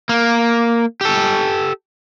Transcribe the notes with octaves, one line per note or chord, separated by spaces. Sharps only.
A#3
G4 A4